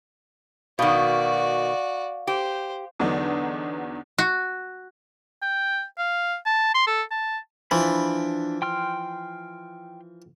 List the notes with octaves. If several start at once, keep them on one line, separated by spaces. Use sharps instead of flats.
B2 D#3 F#4 D5 F5
G4 C5
E2 D3 F#3 B3 D4 D#4
F#4
G5
F5
A5
C6
A4
A5
E3 F3 D4 B5
G5 C6 F6